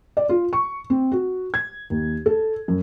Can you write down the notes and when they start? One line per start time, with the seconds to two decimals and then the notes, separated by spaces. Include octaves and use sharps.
0.17 D5
0.29 F4
0.53 C#6
0.90 C4
1.12 F#4
1.54 G#6
1.90 D#2
2.26 A4
2.68 F#2